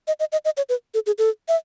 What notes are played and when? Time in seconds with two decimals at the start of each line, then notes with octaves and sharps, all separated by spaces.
0.08 D#5
0.20 D#5
0.32 D#5
0.45 D#5
0.57 C#5
0.69 B4
0.94 A4
1.06 G#4
1.18 A4
1.48 E5